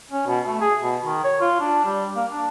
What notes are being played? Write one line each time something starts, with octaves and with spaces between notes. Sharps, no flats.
C#4
B2
A3
G#4
B2
D#3
C#5
F4
D4
G3
A#3
D4